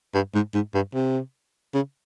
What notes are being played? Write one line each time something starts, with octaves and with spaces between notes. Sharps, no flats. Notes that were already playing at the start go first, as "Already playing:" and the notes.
G2
G#2
G#2
G2
C3
C#3